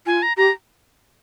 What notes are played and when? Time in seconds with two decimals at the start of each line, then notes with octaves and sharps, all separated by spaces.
0.06 F4 G#5
0.22 A#5
0.37 G4 A#5